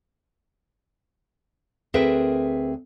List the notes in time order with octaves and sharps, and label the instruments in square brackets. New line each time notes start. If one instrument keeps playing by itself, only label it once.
[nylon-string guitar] D2 C4 G#4 A#4 B4 E5